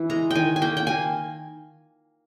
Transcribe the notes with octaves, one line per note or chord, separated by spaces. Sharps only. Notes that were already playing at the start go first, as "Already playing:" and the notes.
Already playing: E3
G#3 A#5
D#3 G5 G#5
G#5
A#3 G5
G5
A#3 G#5